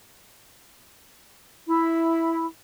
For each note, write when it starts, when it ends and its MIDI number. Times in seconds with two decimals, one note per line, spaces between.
1.67 2.45 64